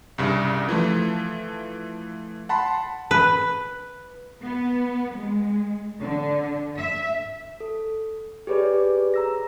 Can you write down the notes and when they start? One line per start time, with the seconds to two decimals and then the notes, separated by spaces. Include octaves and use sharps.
0.18 C2 G2 C#3
0.69 E3 F3 A3
2.49 F#5 A5 B5 C6
3.11 B4
4.42 B3
5.16 G#3
6.00 D3
6.77 E5
7.60 A4
8.47 G4 G#4 B4 C#5 D5
9.14 A#5 E6 A#6